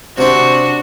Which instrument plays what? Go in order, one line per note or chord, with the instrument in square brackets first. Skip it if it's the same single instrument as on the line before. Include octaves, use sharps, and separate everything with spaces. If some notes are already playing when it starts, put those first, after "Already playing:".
[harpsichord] C3 C4 [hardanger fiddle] D4 F#4